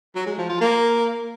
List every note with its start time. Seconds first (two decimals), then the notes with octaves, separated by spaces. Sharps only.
0.15 F#3
0.26 G#3
0.38 F3
0.49 F4
0.61 A#3